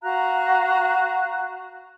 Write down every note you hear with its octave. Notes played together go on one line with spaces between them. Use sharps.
F#4 F5 A#5 F#6